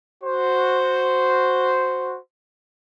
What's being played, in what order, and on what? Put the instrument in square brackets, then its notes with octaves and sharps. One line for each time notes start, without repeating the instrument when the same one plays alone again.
[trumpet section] F#4 C5